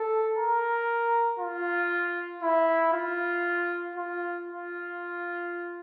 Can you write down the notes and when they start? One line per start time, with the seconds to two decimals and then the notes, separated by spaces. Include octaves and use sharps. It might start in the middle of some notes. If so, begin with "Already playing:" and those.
Already playing: A4
0.37 A#4
1.39 F4
2.42 E4
2.93 F4
3.95 F4
4.47 F4